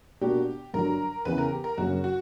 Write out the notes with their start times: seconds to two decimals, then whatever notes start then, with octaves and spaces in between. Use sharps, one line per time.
0.21 B2 A#3 D4 F#4 G4
0.74 G2 D3 F#3 A#4
1.25 E2 C#3 E3 B4
1.38 A#4
1.52 G4
1.64 A#4
1.78 F#2 C#3 F#3 A#3 C#4 F#4
2.04 F#4